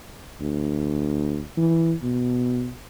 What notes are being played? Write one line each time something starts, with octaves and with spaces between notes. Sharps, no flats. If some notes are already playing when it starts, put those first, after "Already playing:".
D2
E3
B2